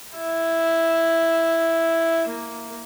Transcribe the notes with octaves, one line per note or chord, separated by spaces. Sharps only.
E4
A#3